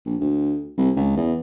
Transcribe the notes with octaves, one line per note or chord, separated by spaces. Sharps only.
A#1
D2
C2
C#2
E2